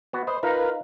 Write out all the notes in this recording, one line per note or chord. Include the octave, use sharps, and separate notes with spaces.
B3 F#4
B4 C5 D#5
D#4 F4 A#4 B4 F5 A#5